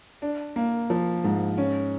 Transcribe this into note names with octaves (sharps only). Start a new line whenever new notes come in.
D4
A#3
F3
G#2
C#4